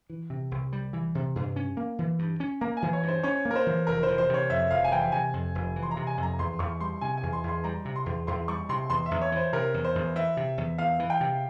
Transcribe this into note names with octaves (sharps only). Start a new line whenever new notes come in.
E3
C3
C2
G3
E3
C3
G2
C#4
A#3
E3
G2
C#4
A#3 A#5
G#5
E3
C#5
G2
C5
C#4 C#5
A#3
A#4
C5
E3
F1 A#4
C5
E3
C5
C3 C#5
F2 E5
F1 F5
G#5
E3 G5
C3 G#5
F2
F1
E3
C6
A#5
C3
G#5
F2
A#5
E2 C6
E2 C#6
G3 C6
C3 G#5
G#5
E2
C6
E2 C6
G3 A#5
C3
C6
E2
E2 C6
G3 C#6
C3 C6
E2 C6
E5
E2
C#5
E3
C5
C3 A#4
E2
C5
E2
E3 E5
C3
E2
E2 F5
E3
G5
C3